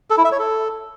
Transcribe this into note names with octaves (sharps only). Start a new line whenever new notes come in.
A4
E4
E5
C#5
A4